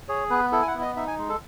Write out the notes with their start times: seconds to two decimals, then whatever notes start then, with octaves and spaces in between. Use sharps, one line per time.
0.08 G#4 C#5
0.30 B3 B4
0.52 E4 A4
0.62 G#5
0.67 F#5
0.74 B3
0.81 D#5
0.96 D#4 E5
1.07 G#5
1.18 G#3
1.29 A4